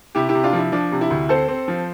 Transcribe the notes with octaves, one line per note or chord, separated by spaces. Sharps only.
C3 E4 G4
E4 G4
C3
D4 F4
F3 E4
F3 D4
C3
E4
D2
C4 A4 C5
C4
F3